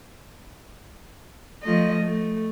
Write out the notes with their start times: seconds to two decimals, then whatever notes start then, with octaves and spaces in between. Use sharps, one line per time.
1.63 F3 A3 D#5
2.03 A3